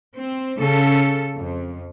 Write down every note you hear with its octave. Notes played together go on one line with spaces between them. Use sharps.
C4
C#3 A4
F2